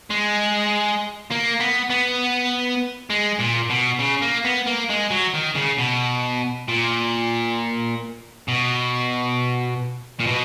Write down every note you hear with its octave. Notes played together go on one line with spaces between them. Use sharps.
G#3
A#3
B3
B3
G#3
A#2
B2
C#3
A#3
B3
A#3
G#3
F#3
D#3
C#3
B2
A#2
B2
A#2
B2